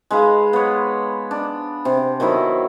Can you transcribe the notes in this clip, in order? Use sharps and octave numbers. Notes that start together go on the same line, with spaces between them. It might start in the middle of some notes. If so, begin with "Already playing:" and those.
G#3 D#4 B4 F5
B3 C#5
D4
C3
D#3 F#3 B3 E4